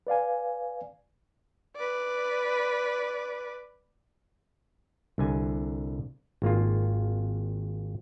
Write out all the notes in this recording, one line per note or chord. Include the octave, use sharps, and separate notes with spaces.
B4 D5 F5 G#5
B4 D5
C2 D3 G#5
G#1 A#3 F4